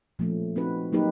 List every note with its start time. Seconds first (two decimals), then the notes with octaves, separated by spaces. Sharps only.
0.19 A#2 F3 A3 C#4
0.56 C4 D#4 F#4 B4
0.92 F#3 A#3 D#4 G4 B4